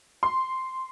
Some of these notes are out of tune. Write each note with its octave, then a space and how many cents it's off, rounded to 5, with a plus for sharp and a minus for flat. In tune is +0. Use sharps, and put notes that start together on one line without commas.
C6 -5